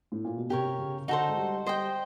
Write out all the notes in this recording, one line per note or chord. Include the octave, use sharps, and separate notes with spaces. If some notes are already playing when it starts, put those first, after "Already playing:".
A2
A#2
B2
C3 G4 A#4 C#5
C#3
D3 D#4 F#4 A4 C5
G#3
G3
G3 C5 D#5 G5